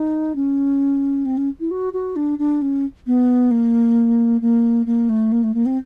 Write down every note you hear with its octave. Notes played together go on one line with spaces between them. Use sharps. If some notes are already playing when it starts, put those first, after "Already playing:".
Already playing: D#4
C#4
C4
C#4
E4
F#4
F#4
D4
D4
C#4
B3
A#3
A#3
A#3
A3
A#3
A3
A#3
C4